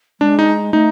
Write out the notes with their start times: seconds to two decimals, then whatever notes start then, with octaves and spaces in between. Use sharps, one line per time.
0.20 G#3 D4
0.39 D#4
0.73 A3 D#4